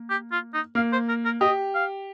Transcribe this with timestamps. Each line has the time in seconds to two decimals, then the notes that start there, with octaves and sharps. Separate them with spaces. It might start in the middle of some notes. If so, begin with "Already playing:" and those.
Already playing: A#3
0.10 G4
0.32 F4
0.54 D#4
0.75 A#3 F5
0.93 C5
1.09 A#4
1.25 A#4
1.41 G4 D#5
1.75 F5